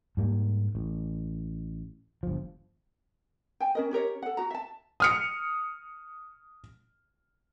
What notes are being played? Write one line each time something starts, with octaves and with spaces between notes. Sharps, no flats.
G#2 G3 A#3
A1
G1 F3
G5 G#5
C#4 A#4 D#5
C#4 G4 A#4 C#5
A4 F#5
F#4 A#5
E5 A5
D#6 F6 C#7